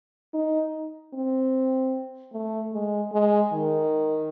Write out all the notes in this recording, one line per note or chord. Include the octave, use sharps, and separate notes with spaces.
D#4
C4
A3
G#3
G#3
D#3